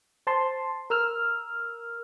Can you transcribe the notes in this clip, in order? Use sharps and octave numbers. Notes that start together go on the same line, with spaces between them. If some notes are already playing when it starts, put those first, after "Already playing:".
C5 A5 C6
A#4 E6 F6